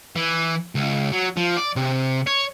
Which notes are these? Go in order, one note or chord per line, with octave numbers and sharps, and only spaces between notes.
E3
C#2
F#3
F3
D5
C3
C#5